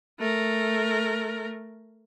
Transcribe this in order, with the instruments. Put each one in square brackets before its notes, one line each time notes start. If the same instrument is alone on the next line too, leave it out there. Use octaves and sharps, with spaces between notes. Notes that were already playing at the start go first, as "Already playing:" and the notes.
[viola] A3 A#4